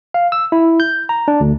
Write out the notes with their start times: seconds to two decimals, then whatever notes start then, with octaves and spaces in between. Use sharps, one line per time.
0.14 F5
0.32 E6
0.52 E4
0.80 G6
1.09 A#5
1.28 D4
1.40 D2